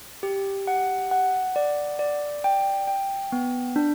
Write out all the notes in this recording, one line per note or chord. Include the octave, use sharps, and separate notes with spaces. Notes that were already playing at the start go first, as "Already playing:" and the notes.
G4
F#5
F#5
D5
D5
G5
G5
B3
D4